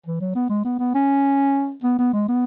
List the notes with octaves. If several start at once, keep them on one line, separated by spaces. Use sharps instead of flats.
E3
F#3
B3
G#3
B3
B3
C#4
B3
B3
G#3
B3